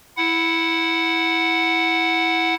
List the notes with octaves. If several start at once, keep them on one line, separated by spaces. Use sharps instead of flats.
E4 F#5